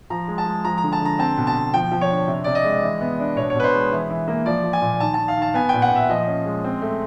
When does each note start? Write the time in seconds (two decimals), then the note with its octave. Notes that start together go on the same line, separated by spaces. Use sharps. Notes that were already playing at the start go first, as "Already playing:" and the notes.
0.10 F3 A#5
0.28 G#3
0.38 A5
0.46 G#3
0.65 F3 A#5
0.78 A#5
0.83 D3
0.92 A5
1.01 D3 A#5
1.19 C4 A5
1.37 B2
1.47 A5
1.56 B2
1.74 F3 G5
1.91 F3
2.01 C#5
2.10 D4
2.28 C3
2.44 C3 D5
2.55 D#5
2.64 G#3
2.83 E3
3.01 B3
3.19 D4
3.36 B2 C#5
3.50 B2 C#5
3.60 B4
3.64 C5
3.73 G#3
3.92 E3
4.10 E3
4.28 A#3
4.46 F3 D5
4.64 F3
4.73 G#5
4.82 A#2
5.00 D#3 A5
5.14 D#3 A5
5.28 F5
5.37 D#3 A5
5.54 B3 G#5
5.69 A#2 G5
5.82 F#5
5.91 A#2 E5
6.09 F3 D#5
6.27 C#4
6.45 G#3
6.64 C4
6.82 A3